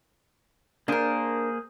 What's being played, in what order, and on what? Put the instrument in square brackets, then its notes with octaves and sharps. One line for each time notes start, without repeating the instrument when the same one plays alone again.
[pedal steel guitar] A#3 G#4 C5 [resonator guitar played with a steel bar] D4 A#4